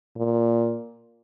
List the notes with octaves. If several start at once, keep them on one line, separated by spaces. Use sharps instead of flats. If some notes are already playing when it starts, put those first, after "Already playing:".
A#2